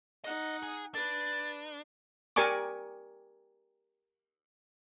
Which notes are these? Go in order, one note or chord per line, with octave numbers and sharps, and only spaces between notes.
D#4 D#5 F#5
G#4
D4 B4 A6
G4 A#4 D5 G#5 C#6 D6